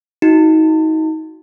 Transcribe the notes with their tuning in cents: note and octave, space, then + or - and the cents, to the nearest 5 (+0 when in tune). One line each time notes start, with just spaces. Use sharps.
D#4 +30 F#4 +0